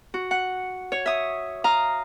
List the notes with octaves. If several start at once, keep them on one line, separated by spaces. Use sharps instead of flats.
F#4
F#5
C#5
E5 D#6
F5 A#5 D#6